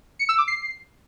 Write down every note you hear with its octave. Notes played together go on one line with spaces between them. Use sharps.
C#7
E6
D6
C7